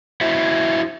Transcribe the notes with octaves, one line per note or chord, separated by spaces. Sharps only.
E4 F#4 C5 E5